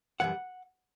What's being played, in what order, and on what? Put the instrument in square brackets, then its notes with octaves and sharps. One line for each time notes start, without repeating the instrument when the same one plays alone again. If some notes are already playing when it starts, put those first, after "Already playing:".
[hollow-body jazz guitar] F#2 E3 G3 F#5